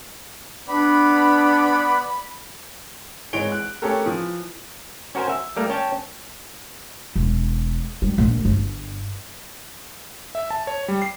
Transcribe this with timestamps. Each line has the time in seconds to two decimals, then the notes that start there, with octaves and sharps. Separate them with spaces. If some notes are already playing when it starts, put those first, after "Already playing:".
0.68 B3 D4 D5 B5
3.33 G#1 E3 G#3 C#5 D7 G7
3.52 F#6
3.82 A3 C#4 G4 A4 A#4
4.06 E3 F3
5.15 C#4 F#4 A#4 C5 G#5
5.29 E5
5.57 G3 A3 A#3 A#4
5.69 C#4 C#5 G5 A5
7.16 E1
8.02 G3
8.18 A#1
8.45 G1
10.35 E5
10.51 A5
10.67 C#5
10.88 G3
11.02 C7